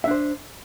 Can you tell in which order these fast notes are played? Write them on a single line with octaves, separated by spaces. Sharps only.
E5 D4 C5